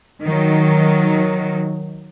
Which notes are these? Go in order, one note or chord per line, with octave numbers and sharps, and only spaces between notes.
D#3 F#3